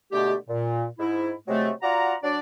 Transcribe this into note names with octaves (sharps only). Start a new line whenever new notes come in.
B2 D3 G#3 A3 G4
A#2
G#2 E4
C3 F#3 G#3 A3
F4 F#4 D5 F#5 A#5
F#3 D4 D5